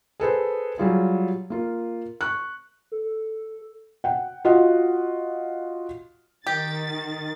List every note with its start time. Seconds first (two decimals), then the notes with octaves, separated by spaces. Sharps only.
0.20 G#4 A4 B4 C5
0.78 F#3 G3 F4 G#4
1.50 A#3 F4
2.21 C#6 F#6
2.92 A4
4.04 F#5 G5
4.45 F4 F#4 D#5 F#5
6.47 D#3 G4 A6